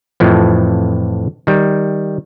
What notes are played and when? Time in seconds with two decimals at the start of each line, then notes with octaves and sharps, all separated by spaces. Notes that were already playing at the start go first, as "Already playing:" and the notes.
0.20 F2 A2 E3 F3
1.47 D#3 G3